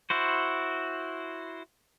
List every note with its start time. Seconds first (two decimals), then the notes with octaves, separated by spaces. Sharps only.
0.10 E4 F#4 C5